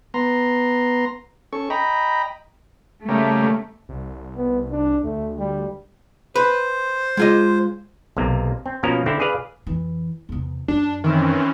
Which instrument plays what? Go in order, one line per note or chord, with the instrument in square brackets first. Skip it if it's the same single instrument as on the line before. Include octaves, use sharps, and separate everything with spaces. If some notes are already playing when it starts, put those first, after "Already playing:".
[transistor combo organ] B3 A#5 C6
C#4 A4 C#6
D#5 G5 A#5 B5
[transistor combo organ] C#3 G3 A#3 [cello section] A3
[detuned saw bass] C2
[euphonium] B3
D4
[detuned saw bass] D2 [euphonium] A3
[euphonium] G3
[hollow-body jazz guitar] B4 [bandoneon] C5
[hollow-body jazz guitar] G#3 F4 D#5
[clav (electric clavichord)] B1 C3 A#3
C4
B2 F3 A#3 C#4 A#4 A#5
D3 C4 E4
G#4 B4 D5 F5
[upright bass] F2 E3
E2 C3
[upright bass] F#2 [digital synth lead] D4
[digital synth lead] D#3 [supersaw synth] E3 C4 C#4